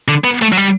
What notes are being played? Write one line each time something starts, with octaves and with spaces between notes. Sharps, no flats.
D3
B3
A3
F#3
G3